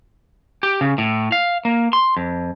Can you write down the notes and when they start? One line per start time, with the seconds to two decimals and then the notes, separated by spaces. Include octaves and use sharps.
0.63 G4
0.81 C#3
0.98 A2
1.32 F5
1.65 A#3
1.93 C6
2.17 F2